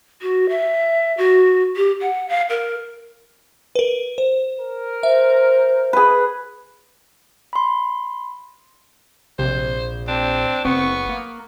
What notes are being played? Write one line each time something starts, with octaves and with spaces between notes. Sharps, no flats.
F#4
E5
F#4
G4
F#5
F5
A#4
A#4 B4
C5
A#4
C5 E5
G#4 B4
B5 C6
A#1 C3 C5
C4 D4
F#1 B3 C4 C#6
A#3